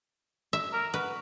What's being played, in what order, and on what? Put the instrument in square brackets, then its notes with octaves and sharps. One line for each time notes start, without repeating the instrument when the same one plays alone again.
[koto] E5
[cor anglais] A#4
[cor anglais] F#4 [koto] B4